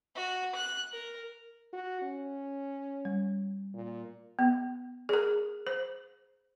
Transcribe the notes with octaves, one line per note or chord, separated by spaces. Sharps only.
F#4
F#6
A#4
F#4
C#4
G3
A#2
B3
G#4 A#4
C5